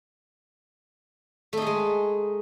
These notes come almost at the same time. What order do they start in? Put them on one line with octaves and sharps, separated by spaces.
A3 D#4 G#4 G#3